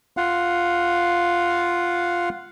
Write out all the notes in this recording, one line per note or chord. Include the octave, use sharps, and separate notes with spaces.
F4 F5 F#5